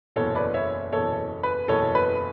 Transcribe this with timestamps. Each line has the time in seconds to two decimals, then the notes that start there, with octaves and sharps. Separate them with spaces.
0.16 F#1 E2 B2 A4 C#5
0.35 B4 D5
0.54 C#5 E5
0.92 F#1 E2 B2 A4 C#5
1.43 B4
1.68 F#1 E2 B2 A4 C#5
1.95 B4